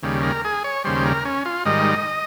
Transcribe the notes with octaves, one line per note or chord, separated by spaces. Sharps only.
D#2 C#3 G3
A#4
G#4
C#5
D#2 C#3 G3 C5
A#4
C#4
F4
G#2 D#3 G3 D#5